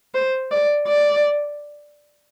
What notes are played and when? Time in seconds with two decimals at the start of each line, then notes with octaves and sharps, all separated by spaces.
0.14 C5
0.51 D5
0.88 D5